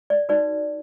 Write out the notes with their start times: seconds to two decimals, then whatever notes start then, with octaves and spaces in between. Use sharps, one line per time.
0.10 D5
0.29 D#4 F#4 B4 D5